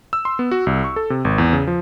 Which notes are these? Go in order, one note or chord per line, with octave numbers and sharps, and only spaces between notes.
E6
C6
B3
F#4
C2
C#6
A4
C3
G#1
E2
C#3
F3